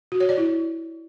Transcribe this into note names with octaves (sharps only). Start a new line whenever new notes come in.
F#4
C#5
D5
E4